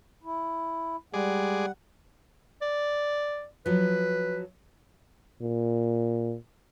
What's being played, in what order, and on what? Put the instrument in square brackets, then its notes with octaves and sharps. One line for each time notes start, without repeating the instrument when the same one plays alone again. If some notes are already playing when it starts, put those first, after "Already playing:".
[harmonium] E4
[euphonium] G3 [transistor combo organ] G#3 G#4 D5 [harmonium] F#5
[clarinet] D5
[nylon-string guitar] F3 F#3 [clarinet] B4
[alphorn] A#2